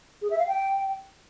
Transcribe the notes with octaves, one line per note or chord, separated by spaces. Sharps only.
G#4
E5
F5
G5